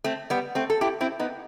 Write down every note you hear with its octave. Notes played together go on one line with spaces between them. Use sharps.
A3 C4
G3 B3
A3 C4
A4
E4 G4
C4 E4
B3 D#4